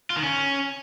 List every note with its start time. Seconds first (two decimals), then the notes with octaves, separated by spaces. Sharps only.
0.10 F4
0.17 D#3
0.23 C#4